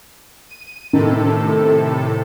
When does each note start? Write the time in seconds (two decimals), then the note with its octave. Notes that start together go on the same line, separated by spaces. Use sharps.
0.49 D#7
0.93 A2 C3 D#3 A4